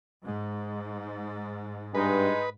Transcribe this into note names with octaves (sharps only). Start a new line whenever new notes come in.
G#2
G2 G#3 D#4 B4